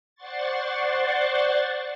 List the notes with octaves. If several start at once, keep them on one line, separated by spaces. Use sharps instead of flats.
C5 D5 F#5 C6 C#6 A6